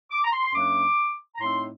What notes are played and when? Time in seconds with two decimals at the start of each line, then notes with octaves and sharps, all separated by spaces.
0.11 D6
0.25 A#5
0.33 C6
0.44 C6
0.55 F#2 F#3 A#3 D4 D6
1.35 A#5
1.41 A2 A3 C4 D#4 C6